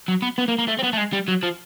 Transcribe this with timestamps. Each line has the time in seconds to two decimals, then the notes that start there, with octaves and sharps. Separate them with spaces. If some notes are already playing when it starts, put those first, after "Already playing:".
0.08 F#3
0.22 B3
0.38 B3
0.48 A#3
0.58 A#3
0.68 A3
0.79 C4
0.83 B3
0.93 A3
0.97 G#3
1.13 G3
1.28 F#3
1.43 F3